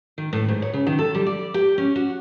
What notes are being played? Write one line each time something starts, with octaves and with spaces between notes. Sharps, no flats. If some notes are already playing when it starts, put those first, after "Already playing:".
D#3
A2
G#2
C#5
C#3
D#3
A4
G3
D5
G4
C#4
F#4